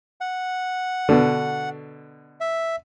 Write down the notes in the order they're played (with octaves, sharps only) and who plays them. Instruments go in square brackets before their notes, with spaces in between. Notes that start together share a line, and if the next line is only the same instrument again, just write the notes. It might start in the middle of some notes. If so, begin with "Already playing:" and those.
[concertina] F#5
[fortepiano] B2 D3
[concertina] E5